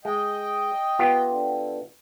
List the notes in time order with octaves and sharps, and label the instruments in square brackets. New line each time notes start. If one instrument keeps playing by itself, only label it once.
[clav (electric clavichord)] G#3 [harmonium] D#5 G5
[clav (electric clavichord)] B3 F4 G4
[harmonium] D3